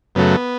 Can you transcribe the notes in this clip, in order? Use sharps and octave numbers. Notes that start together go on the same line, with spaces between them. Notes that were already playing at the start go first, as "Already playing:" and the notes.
F#2 C#3 F#3 A3 B3